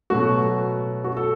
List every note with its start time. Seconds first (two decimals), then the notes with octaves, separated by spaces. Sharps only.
0.10 B2 F#3 A3 F#4
1.04 F#4
1.17 A4